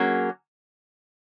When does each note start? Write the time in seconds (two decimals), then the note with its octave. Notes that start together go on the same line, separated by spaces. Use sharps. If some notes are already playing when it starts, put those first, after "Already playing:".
Already playing: F#3 A#3 C#4 G#4